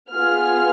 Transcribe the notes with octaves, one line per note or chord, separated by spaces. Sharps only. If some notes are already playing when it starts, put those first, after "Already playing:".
B3 F4 G#4 F6